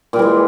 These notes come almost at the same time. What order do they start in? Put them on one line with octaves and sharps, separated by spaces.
A#2 G3 E3 G#3